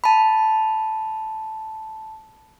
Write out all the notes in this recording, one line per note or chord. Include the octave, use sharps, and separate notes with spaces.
A5 B5